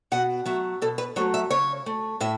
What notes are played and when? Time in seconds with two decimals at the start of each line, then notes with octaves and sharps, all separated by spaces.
0.12 B2 F#5
0.46 F#3 A3 E5
0.82 B2 A4
0.98 B4
1.16 F#3 A3 C#5
1.34 E5
1.51 C#3 C#5
1.86 A3
2.21 A2 E5